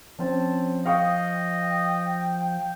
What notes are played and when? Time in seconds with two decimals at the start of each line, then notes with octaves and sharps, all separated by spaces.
0.19 F3 C4 C#4 A5
0.86 D#5 F5 G5 C#6 D#6